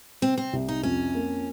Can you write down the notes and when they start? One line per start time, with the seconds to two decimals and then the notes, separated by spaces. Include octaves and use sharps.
0.22 C3 C4
0.38 C4
0.53 C2
0.68 D#4
0.83 F2 C#4
1.15 A#3